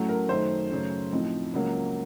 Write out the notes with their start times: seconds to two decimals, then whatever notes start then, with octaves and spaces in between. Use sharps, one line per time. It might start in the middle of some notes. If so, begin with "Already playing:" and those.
Already playing: A2 F#3 A3 C#4
0.09 A#4
0.29 F#2 D#3 A3 D#4 C5
0.70 F#2 C#3 A3 C#4
1.12 A2 F3 C4 D#4
1.54 C#2 C#3 F#3 A#3